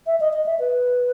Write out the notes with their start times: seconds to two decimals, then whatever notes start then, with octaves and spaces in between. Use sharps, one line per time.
0.07 E5
0.20 D#5
0.33 D#5
0.46 E5
0.60 B4